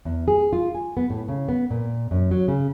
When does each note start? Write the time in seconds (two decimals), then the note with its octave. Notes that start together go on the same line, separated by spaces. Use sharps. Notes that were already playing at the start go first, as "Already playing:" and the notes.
0.05 E2
0.28 G#4
0.53 F4
0.75 G#5
0.97 B3
1.10 A2
1.28 C#3
1.48 B3
1.70 A#2
2.11 F#2
2.31 F#3
2.48 C#3